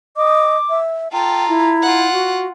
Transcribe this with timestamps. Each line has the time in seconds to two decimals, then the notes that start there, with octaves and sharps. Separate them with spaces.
0.17 D#5 D6
0.70 E5
1.13 F4 A4 G5 A#5
1.48 E4
1.82 F4 F#5
2.13 F#4